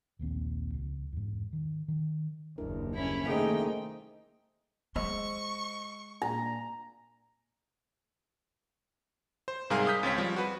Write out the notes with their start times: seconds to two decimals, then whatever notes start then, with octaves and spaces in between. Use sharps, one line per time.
0.19 D#1 A#1 D#2 C4
0.74 C#2
1.13 E2 G#2
1.53 D#3
1.88 D#3
2.58 F#1 D#2 D4 E4 A#4
2.94 G3 A#3 C#4 E4
3.27 C3 D#3 A3 A#3 D#4 G#4 C5 G5
4.96 G#3 C5 D#5 C#6 E6
6.22 A#2 D4 G#5 A#5
9.48 C5
9.70 G#2 C3 G3 G#4 A#4 F5
9.87 D#6 F6 G6 B6
10.03 C#2 C4 C#5 B6
10.18 F3 G3
10.36 F#4 B4